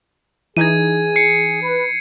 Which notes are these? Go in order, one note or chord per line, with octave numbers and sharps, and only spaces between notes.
E3 D#4 G#4 G#6 D#7
C7 C#7
B4